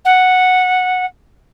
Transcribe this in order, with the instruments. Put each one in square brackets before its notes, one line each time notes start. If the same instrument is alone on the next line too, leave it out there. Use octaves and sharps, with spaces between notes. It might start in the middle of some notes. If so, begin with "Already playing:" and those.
[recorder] F#5